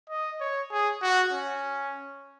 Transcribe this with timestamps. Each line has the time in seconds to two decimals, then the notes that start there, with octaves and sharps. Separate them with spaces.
0.09 D#5
0.41 C#5
0.71 G#4
1.02 F#4
1.32 C#4